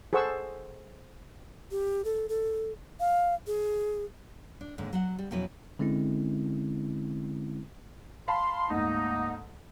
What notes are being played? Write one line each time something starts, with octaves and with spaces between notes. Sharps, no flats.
G#4 A4 C5 F#5 C#6 E6
G4
A4
A4
F5
G#4
D4
D#2 G#2 D3
F#3 F#4 F#5
G3
F2 B2 F#3 C#4 E4 B4
D3 G#3 C4 C#4 E4
F5 A5 B5 C6
D2 G#2 A#3 D#4